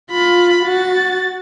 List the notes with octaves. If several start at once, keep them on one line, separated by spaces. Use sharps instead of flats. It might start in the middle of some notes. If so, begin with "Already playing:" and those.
F4 B5
F#4 A6